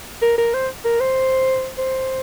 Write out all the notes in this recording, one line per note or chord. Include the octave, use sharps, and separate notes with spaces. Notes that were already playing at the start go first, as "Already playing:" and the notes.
A#4
A#4
C5
A#4
C5
C5